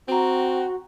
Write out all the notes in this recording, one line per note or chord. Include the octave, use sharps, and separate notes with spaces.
C4 F#4 G5 A#5